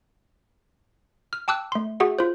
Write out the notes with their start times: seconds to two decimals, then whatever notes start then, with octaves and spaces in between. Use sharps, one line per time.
1.33 F6
1.48 G5 A5 D6 E6 F#6
1.72 A3 C6
2.00 F#4 G#4 E5 F#5
2.19 F4 C5